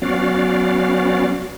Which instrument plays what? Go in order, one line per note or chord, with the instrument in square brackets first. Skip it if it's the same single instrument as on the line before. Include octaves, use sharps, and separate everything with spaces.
[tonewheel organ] F#3 B3 C#4 F#4 D5 F5